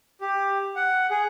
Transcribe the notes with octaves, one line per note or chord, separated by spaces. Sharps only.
G4
F#5
G#4